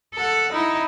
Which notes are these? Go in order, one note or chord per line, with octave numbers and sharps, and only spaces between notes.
A4 F#5
D#4 E4